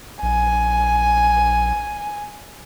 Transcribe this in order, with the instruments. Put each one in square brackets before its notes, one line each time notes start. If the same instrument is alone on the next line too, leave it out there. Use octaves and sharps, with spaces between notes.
[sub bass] A#1 [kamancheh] G#5